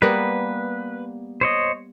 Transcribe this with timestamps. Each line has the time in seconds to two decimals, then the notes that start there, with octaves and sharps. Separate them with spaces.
0.02 G3 A#3 B3 B4
1.41 C5 C#5 D#5